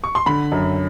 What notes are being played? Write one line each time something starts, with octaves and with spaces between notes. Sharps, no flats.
C#6
C6
D3 B5
F#2